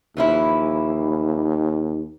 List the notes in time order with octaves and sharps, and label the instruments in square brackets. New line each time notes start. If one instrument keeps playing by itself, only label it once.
[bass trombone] D#2 [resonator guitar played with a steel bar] E3 F3 E4